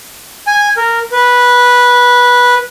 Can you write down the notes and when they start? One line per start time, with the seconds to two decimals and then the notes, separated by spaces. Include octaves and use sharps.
0.47 G#5
0.77 A#4
1.12 B4